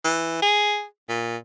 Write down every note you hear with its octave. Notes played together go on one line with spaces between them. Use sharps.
E3
G#4
A#2